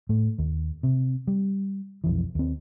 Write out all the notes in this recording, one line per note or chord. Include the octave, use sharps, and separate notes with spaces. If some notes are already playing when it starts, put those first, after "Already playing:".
A2 A3
D#2
C3
G3
B1 F2 E3
D#2 C4